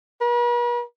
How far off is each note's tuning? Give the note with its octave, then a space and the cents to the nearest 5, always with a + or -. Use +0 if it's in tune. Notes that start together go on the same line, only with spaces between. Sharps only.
B4 -45